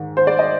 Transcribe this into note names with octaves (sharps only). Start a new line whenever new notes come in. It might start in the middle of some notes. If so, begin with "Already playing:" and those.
Already playing: G#2 D#3
C5
D5
D#5